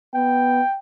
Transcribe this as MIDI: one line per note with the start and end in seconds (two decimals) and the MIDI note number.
0.15 0.61 59
0.15 0.79 79